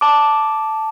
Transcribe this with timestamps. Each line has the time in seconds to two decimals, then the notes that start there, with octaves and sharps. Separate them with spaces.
0.01 A5 D6